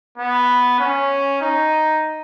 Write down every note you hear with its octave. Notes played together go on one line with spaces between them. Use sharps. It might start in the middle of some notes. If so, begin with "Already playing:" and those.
B3
C#4
D#4